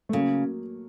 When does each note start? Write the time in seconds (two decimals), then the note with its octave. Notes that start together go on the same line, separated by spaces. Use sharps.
0.09 A3
0.13 C#3 F#3 A#3